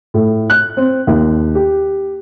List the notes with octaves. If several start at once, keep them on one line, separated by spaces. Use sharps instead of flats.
A2
F#6
C4
D#2
G4